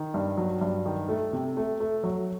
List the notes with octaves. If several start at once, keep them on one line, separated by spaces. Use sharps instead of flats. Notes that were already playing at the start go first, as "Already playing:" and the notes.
Already playing: D#3
G2
F#3
G2
D#3
A3
C3
A3
A3
F#3